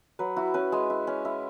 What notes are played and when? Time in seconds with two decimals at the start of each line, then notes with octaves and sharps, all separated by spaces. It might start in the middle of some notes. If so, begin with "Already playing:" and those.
0.19 F#3 B4
0.36 E4 F#4
0.54 C#4 B4
0.72 G#3
0.90 E4
1.07 C#4
1.25 E4